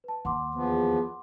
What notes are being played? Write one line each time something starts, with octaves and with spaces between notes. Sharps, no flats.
B4 A5
D#2 F#5 C6 D6
E2 F3 B3